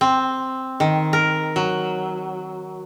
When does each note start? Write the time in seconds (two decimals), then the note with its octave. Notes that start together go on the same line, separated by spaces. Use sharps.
0.01 C4
0.80 D#3
1.13 A#4
1.56 F#3